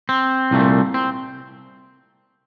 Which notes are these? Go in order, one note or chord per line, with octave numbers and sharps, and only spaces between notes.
C4
C2 A#2 A3
C4